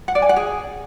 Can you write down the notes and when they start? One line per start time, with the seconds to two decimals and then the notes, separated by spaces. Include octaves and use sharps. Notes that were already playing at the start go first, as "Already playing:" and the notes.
0.08 F#5
0.15 D5
0.22 G#5
0.29 F#5
0.36 G#4